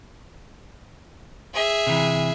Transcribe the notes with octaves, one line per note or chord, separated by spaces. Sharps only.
G#4 E5
C3 E3